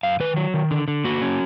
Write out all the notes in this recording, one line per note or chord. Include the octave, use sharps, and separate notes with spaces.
F#2 F5
D#3 B4
F#3
D#3
D3
D3
A#3 F#4
C#4